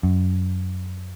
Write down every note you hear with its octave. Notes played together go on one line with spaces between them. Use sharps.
F#2